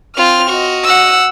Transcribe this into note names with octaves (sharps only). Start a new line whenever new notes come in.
C4 F4 F6
F#4 D#5
F#5 E6